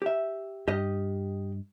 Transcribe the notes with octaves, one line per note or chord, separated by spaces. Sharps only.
G4 E5
G2 G4 D#5